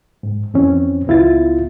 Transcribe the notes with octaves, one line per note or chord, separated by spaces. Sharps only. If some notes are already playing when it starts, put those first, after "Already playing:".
G#2
F2 E3 C4 C#4
C#2 B3 E4 F4 A6